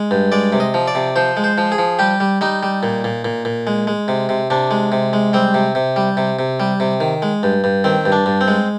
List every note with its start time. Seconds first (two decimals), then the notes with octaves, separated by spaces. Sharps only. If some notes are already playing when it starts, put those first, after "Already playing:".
Already playing: G#3
0.11 G2
0.32 G#3 D5
0.53 C3
0.60 D#5
0.74 F3
0.88 D5
0.95 C3
1.16 F3 C5
1.37 G#3
1.44 C5
1.58 F3
1.72 G#4
1.78 F3
1.99 G3 G4
2.20 G3
2.41 G3 D#4
2.63 G3
2.83 A#2
3.04 A#2
3.25 A#2
3.45 A#2
3.67 G#3
3.87 G#3
4.08 C3
4.29 C3
4.50 C3 D4
4.71 G#3
4.92 C3
5.13 G#3
5.33 G3 C4
5.54 C3
5.75 C3
5.96 G3
6.17 C3
6.39 C3
6.60 G3
6.80 C3
7.00 D#3
7.22 G#3
7.43 G2
7.64 G2
7.84 D#3 C4
8.05 G2
8.12 D4
8.26 G2
8.41 C4
8.48 G#3